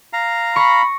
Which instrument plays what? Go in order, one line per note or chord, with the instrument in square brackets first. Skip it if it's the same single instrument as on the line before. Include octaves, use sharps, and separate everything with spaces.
[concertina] F5 A#5
[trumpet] B5 [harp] C#6 A#6 C7